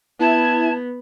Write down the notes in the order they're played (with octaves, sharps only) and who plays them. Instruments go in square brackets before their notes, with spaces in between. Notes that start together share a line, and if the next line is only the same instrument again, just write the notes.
[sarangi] B3 [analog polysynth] E4 G#6 [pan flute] A5